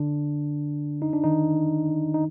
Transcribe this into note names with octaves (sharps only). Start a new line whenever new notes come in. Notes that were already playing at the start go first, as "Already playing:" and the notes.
Already playing: D3 D4
D#4
D4
D#3 D#4
D#4